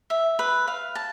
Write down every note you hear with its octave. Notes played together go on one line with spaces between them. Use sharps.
E5
B4
F5
A5